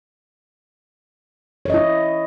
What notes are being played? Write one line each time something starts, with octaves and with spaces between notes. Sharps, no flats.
E4 C#5 D#5